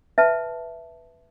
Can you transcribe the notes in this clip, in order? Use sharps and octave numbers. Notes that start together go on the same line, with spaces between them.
B4 E5 A5